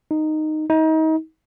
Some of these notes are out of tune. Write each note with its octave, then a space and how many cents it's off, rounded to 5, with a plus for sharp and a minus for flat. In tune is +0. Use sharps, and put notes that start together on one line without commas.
D#4 -10
D#4 +30